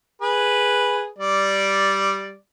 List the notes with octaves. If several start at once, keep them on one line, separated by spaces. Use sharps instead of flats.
G#4 B4
G3 D5